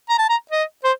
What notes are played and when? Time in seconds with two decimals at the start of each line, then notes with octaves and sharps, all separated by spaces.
0.09 A#5
0.19 A5
0.29 A#5
0.51 D#5
0.84 C5